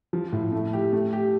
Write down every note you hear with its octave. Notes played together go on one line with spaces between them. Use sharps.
F3
A2
A3
G4
A3
G4